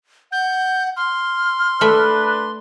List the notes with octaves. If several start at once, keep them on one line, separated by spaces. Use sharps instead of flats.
F#5 G6
C6 F6
A3 D4 B4 E5